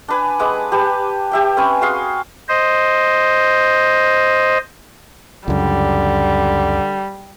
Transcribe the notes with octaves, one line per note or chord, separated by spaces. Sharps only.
D4 B4 G#5
G#3 B4 F#5 D6
G4 B4 A5
G4 E5 G5
C4 C#4 B4 G#5
F#4 G#4 F5 C6
C5 D#5
C#2 F#2 D3 G3